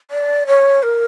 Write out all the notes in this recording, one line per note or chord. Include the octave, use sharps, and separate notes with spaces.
D5
C#5
A#4